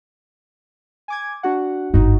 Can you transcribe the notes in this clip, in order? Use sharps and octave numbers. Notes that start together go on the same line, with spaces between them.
G#5 D6 G#6
D4 F#4 F#5
G1 G#2 D#4 F#4